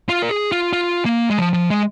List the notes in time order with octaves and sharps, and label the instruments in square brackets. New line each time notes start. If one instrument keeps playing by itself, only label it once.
[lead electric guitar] F4
A#4
G#4
F4
F4
A#3
G#3
F3
F3
G#3